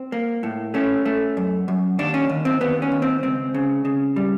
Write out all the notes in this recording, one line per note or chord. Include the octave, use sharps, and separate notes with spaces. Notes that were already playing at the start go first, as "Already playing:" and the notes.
Already playing: C4
A#3
A2
A3 C#4
A3
F#2
F#2
D#2 D4
C#4
D#2
C4
D#2 B3
C#4
D#2
C4
C#2 C4
C#3
C#3
G3